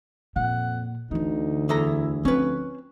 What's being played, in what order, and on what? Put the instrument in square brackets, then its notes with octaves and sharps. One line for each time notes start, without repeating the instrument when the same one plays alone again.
[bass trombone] F2 [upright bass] A#2 [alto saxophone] F#5
[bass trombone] D2 [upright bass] D3 E3 [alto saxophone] D#4
[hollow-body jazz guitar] E2 A4 A#5 [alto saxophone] E4
[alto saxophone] F3 [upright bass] C4 [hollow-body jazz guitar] C#4 B4